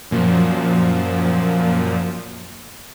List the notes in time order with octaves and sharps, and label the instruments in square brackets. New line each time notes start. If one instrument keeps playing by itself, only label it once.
[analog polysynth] F#2 A#2 F3